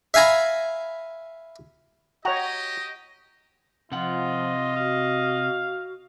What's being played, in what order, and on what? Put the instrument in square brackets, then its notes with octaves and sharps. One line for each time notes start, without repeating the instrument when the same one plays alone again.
[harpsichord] E5 F5 G#5 A#5 B5
[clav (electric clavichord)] F#4 F#5 G5 [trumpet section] G4 D#5 [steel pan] C#5 A#5
[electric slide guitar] C3 F#5 [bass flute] F3 [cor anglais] F4 [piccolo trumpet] D#5
[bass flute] F#4 [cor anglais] F5